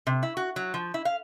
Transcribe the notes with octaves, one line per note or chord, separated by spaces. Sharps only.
C3
E4
F#4
F#3
F3
E4
F5